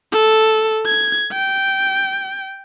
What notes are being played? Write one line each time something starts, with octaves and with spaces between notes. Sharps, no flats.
A4
G#6
G5